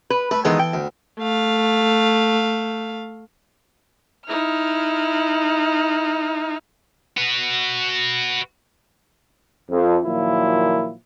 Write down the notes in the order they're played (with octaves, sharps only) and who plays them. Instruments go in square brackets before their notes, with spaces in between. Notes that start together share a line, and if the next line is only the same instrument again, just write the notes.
[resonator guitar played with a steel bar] B4
[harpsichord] A3 [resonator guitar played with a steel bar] B4
[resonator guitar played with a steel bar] D#3 G#3 B3 [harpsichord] E3 A4
[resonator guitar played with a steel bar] G5
[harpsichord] D2
[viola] A3 F5
[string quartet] D#4 E4 F6
[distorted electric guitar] F#4 B4
[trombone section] F2
A#2 D#3 F3 F#3 A#3 E4